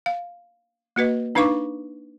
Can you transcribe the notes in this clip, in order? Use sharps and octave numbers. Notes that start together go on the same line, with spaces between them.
F5
A#3 F#4 B4 D#5
D4 D#4 B4 F5 C#6 D6